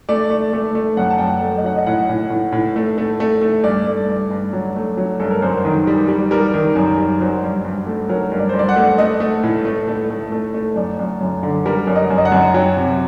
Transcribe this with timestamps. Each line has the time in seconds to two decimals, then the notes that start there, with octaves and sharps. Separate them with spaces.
0.09 A3 D5
0.30 A3
0.53 A3
0.75 A3
0.97 F#2 F#5
1.10 A5
1.18 F#2 G5
1.27 F#5
1.42 A3
1.57 D#5
1.64 F#3 F#5
1.76 D#5
1.86 A2 F#5
2.09 A2
2.30 A2
2.52 A2
2.76 A3
2.98 A3
3.20 A3
3.41 A3
3.64 G2 D5
3.87 A3
4.09 G2
4.30 G2
4.53 F#3
4.76 A3
4.97 F#3
5.20 G2 A4
5.31 A#4
5.42 F#2 C5
5.65 D#3
5.87 G3
6.09 G3
6.31 G3 A#4
6.54 D#3
6.76 F#2
6.98 G3
7.21 F#3 C5
7.43 G2
7.65 G2
7.86 A3
8.09 F#3 A#4
8.32 G2
8.39 D5
8.49 G2 C5
8.59 D5
8.69 F#5
8.76 A3
8.98 A3 D#5
9.20 A3
9.43 A2
9.65 A3
9.88 A3
10.10 A3
10.32 A3
10.54 A3
10.76 F#2 D5
10.99 F#2
11.21 F#2
11.43 D3
11.66 G3 A#4
11.87 F#2
11.96 D#5
12.10 F#2
12.18 D#5
12.25 F#5
12.32 F#2
12.54 F#3 G5
12.77 C3